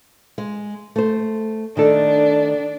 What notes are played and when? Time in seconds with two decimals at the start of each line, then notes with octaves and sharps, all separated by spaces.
0.38 G#3
0.96 A3 C5
1.77 D#3 A3 D4 A4